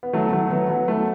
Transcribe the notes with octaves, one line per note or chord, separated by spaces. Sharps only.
B3
F#3 A3
F#3 A3
F#3 B3
F#3 B3
F#3 A3